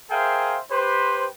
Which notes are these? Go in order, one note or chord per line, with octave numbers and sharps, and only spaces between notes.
G#4 A#4 C5 E5 F5 G5
G4 B4 C5